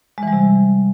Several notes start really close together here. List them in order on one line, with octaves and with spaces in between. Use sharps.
G#3 E3 G3 C3